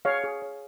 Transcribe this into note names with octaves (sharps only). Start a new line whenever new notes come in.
G#4 C#5 F5
G#4
C#5